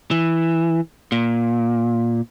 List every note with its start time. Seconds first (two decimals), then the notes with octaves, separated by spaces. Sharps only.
0.11 E3
1.12 A#2